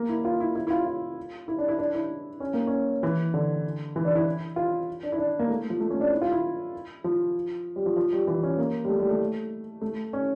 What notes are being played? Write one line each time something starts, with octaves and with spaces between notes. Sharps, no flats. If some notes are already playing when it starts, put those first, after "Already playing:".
Already playing: A#3
E4
F4
E4
E4
E4
F4
F4
E4
D4
E4
D4
E4
C#4
A#3
C#4
E3
D3
E3
D4
E4
F4
D4
E4
D4
A#3
A3
F3
A3
C#4
D4
E4
F4
E4
F3
G3
F3
F3
G3
E3
C#4
A#3
G3
A3
G3
A3
A3
C#4